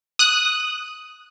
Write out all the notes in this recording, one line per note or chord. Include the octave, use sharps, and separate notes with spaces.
D#6 F#6